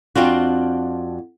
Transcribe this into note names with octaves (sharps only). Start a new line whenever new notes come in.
F2 C4 D4 F4 F#4